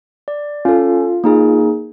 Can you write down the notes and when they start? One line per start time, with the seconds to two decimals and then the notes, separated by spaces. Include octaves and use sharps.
0.28 D5
0.65 C#4 F4 A4
1.24 A#3 D#4 G#4